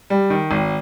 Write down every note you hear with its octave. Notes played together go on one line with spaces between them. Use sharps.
G3
D#3
G#1